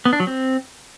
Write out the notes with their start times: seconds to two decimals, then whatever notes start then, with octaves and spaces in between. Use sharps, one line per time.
0.05 B3
0.13 D4
0.20 F#3
0.27 C4